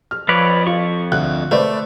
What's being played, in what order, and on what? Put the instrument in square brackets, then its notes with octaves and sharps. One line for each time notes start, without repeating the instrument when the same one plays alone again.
[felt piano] F6
[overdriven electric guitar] F2 [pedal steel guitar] B4 C#5 D5
[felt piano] F4 [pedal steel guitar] C#6
[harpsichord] D2 [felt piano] F#6
[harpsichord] A3 [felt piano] B4 C5 D5